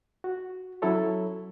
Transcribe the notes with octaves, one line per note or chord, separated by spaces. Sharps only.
F#4
F#3 C#4 E4 A4 C#5